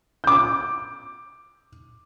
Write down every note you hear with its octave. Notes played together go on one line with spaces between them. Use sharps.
D6 G6